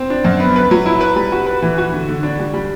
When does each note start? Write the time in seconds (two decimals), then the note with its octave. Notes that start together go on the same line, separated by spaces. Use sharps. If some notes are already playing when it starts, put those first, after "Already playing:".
Already playing: C4
0.10 D4
0.25 F#2
0.40 B3
0.56 B4
0.71 F#3
0.86 E4
1.01 B4
1.16 G3
1.32 F#4
1.46 B4
1.62 E3
1.78 F#4
1.93 D3
2.08 D3
2.23 D4
2.39 G3
2.53 G3